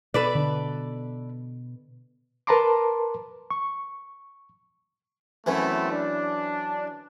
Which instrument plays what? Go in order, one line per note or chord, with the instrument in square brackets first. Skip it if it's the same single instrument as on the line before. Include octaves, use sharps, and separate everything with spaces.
[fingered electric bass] B2 B3 [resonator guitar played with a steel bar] A4 B4 D5
[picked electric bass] D3
[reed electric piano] A#4 B4 A5 A#5 C6 D6
C#6
[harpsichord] F#2 E3 [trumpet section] A3 B3 C4
[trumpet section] D4